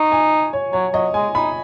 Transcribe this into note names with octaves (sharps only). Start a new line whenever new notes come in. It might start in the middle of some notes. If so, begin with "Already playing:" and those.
Already playing: D#4 C#6
G#5
C#5
F#3 C#5
F#3 D#5
G#3 G#5
D#4 B5